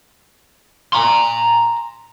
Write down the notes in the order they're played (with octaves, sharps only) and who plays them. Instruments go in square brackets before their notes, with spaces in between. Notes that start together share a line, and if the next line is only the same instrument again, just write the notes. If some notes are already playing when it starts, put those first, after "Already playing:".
[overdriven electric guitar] A#5 C6